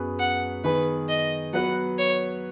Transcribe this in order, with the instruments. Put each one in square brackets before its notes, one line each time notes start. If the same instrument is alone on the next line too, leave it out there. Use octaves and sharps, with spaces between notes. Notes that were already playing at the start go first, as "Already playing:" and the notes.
Already playing: [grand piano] F#2 F#3 B3 G#4 B4
[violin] F#5
[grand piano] D#3 B3 G#4 [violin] B4
[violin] D#5
[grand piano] F#3 B3 F#4 B4 [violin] F#5
[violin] C#5